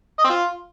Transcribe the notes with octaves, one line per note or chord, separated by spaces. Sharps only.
D#5
C4
F4